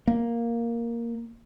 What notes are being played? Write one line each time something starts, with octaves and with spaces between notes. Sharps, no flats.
A#3